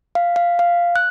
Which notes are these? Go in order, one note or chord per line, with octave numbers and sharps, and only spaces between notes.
F5
F5
F5
F#6